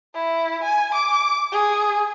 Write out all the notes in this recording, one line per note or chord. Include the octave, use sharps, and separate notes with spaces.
E4
G#5
D6
G#4